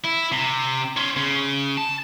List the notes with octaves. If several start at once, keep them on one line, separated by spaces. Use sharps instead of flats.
E4
C3
C#4 C5
C#3
A5